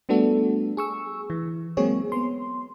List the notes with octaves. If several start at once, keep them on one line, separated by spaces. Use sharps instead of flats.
G3 A3 B3 D4 F#4 A4
G#4 C#6 E6
E3
F#3 G#3 A#3 C4 G#4 C#5
B3 C6